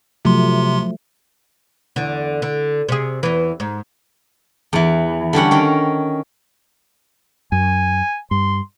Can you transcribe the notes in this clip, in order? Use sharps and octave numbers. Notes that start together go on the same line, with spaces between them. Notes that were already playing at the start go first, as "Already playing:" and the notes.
C3 F3 F#3 A3 C6
E2 D3
D3
C3 G#4
E2 E3
G#2
E2 E3
D3 G3 C#4 F#5
D#3 C#4 A#4
F#2 G#5
G2 C6